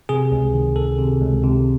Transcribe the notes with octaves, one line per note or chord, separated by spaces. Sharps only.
C3 G#4
C#2
D#3
C#2 A4
C3
C#2
C3